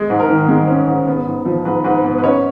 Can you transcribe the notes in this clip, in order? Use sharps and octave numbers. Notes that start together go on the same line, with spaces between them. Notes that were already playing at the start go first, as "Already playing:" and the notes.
Already playing: G#3
G#2
A#4
D#3
G#3
C#4
G#2
B3
G#2
F3
G#2 B4
G#2 B4
B3
B4
C#4 C#5